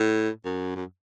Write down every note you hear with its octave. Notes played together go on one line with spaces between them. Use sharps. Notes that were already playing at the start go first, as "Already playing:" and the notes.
Already playing: A2
F#2
F#2